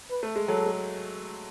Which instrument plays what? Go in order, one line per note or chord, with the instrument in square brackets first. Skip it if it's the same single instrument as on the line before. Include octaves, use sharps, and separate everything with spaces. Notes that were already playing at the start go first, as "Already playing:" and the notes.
[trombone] B4
[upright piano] A3
G#3
[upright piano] F#3 [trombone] A4
[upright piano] G#3